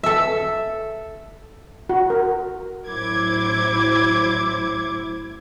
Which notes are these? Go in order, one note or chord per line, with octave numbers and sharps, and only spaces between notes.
A4 E5
F#4
A#4
A1 F#3 E4 C5 D6 G#6